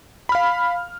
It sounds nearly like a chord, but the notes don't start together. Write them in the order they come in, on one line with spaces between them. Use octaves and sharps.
B5 F6 F5